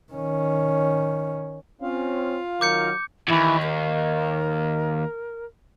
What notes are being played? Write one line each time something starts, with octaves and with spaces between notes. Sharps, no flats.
D#3 C#4
C4 C#4 F4 F5
D#3 F#3 A#4 D6 G6 C#7
D#2 G#2 E3
A#4